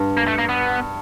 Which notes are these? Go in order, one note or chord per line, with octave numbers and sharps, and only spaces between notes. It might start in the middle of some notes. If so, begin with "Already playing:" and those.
Already playing: G2
A#3
A3
A#3
B3